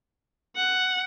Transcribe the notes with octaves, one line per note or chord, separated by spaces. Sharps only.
F#5